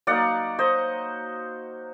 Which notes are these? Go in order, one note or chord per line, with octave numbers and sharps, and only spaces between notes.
F#3 A#3 D#4 D5 F#5
C5 D#5